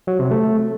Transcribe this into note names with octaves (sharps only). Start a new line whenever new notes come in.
F#3
C3
A3